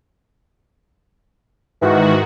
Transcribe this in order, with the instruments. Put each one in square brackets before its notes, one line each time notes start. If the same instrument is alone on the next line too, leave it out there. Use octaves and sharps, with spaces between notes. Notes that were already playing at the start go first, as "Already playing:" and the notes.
[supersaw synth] G#2 D#3 F#4 [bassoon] E3